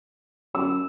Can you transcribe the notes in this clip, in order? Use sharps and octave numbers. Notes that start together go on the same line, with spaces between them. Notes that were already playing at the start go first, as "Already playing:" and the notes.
F#2 E6